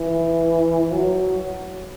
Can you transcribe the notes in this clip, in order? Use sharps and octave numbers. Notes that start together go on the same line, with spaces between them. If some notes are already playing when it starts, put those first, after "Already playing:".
Already playing: E3
F#3